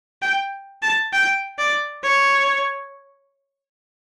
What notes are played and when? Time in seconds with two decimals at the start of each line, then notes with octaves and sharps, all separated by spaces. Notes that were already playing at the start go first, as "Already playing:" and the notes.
0.22 G5
0.82 A5
1.12 G5
1.58 D5
2.03 C#5